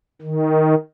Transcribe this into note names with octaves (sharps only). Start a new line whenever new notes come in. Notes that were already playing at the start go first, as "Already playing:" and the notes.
D#3